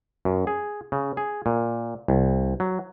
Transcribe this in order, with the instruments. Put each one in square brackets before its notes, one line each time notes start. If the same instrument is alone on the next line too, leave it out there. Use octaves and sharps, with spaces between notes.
[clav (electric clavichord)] F#2
G#4
C#3
G#4
A#2
C2
F#3